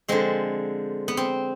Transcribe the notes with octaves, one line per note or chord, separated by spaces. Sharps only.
D3 F3 G#3 C4
B3
C4